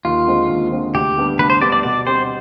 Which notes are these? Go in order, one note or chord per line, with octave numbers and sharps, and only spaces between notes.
D#2 F4
D3 G#3 C4
D#2
D3 G#3 C4
D2 G4
D3 G3 B3 D4
D2 B4
C5
D3 G3 B3 D4 D5
D5
B2 D5
G3 C4 G4 C5